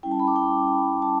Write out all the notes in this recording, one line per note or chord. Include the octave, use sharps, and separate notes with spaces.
G3 C#4 E4 G5
A5
B5
D6
G5
A5